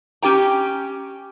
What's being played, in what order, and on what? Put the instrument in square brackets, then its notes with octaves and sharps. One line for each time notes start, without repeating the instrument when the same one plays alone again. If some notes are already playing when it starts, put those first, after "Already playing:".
[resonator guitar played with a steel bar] C#4 G4 G5 A#5